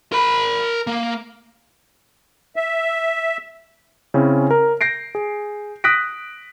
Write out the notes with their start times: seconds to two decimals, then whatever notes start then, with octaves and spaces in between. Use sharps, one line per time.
0.12 A#4 B5
0.87 A#3
2.56 E5
4.14 C#3 C4 C#4 E4
4.51 A#4
4.81 G6 A#6 C7 D7
5.15 G#4
5.84 D#6 F#6 A#6 B6 D7